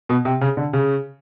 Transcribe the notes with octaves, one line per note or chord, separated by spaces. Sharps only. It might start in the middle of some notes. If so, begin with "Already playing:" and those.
B2
C3
C#3
D3
C#3